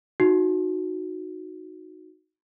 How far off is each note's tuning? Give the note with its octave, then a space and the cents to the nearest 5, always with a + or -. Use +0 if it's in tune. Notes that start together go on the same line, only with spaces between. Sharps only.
D#4 +0 F#4 -10